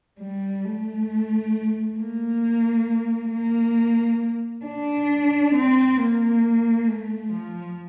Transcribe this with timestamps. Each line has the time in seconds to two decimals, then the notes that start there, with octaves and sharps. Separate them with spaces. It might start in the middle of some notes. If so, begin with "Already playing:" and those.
0.20 G3
0.65 A3
1.99 A#3
3.31 A#3
4.65 D4
5.55 C4
5.99 A#3
6.89 A3
7.33 F3